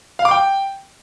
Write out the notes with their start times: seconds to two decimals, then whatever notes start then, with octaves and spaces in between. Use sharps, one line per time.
0.19 F5
0.25 D6
0.31 G5